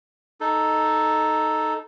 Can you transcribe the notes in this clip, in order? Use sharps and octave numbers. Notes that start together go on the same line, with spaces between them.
D#4 A4